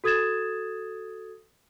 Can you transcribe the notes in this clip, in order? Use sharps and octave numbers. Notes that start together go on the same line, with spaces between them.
F#4 A4 D#6 G#6 A6 E7